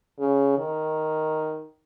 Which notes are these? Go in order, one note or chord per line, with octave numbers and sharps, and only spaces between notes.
C#3
D#3